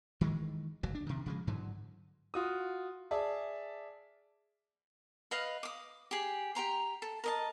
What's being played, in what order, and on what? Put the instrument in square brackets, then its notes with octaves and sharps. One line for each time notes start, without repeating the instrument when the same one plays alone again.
[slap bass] D#3 E3 G#3
F1 C#2 F#3
D4
C3 D#3
C#3 F3 G#3
G#2 D3 E3 F#3
[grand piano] F4 F#4 D#6
G#4 D5 E5 A5
[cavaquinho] B4 D#5 F5
D6 D#6
G4 G#4
G4 G5 A#5 C6
A4
A#4 D#5 A5